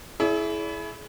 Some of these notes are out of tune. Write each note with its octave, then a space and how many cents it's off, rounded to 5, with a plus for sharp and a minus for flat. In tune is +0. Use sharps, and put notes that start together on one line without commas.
E4 +0 G#4 +35 D5 -40